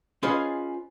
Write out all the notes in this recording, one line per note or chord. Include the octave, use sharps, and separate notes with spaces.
C#4 F4 G#4 B4 C5 D#5